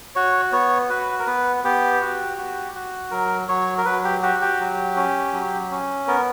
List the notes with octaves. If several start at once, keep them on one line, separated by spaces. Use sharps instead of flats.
F#4 C#5
B3 C#5
F#4 B4
A#4
B3 B4
B3 G4
F#4
F#4
F#4
F#3 A#4
F#3 C#5
A#4
F#3 B4
G4
F#4 G4
G4
F#3
C#4
F#3
C#4
B3 A#4